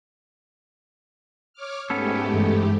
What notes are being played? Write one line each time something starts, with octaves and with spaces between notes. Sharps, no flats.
C#5 D6 F6
G#2 A3 B3 C#4 G4 A4
G2 E3 G#3